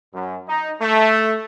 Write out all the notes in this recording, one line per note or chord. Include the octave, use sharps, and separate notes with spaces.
F#2
D#4
A3